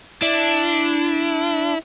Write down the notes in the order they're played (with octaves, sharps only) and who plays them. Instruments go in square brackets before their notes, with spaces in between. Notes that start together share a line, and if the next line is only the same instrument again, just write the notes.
[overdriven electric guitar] D4 [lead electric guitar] E4